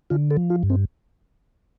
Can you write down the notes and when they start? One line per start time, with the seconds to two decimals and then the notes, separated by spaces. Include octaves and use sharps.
0.10 D3 F4
0.31 A4
0.37 F3
0.50 F4
0.63 G2
0.70 C4